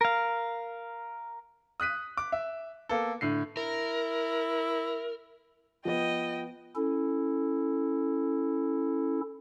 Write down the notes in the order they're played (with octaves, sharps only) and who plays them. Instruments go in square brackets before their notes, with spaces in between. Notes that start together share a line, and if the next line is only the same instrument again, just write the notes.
[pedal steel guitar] A#4 F5
[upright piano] D#6 F#6 B6 D#7
D6
E5
A#3 B3 A4
A2 D3 C7
[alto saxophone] E4 [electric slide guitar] A#4
[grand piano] F3 B3 [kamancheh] D#5 G5
[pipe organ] C#4 E4 A4